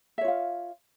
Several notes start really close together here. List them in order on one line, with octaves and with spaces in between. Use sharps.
E5 C#5 F4 F5